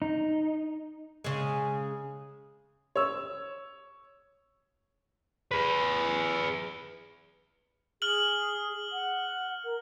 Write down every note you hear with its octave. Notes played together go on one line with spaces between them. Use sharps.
D#4
C#3 G#3
C#5 E6
G#4 B4
G#4 F6 F#7
F#5
A#4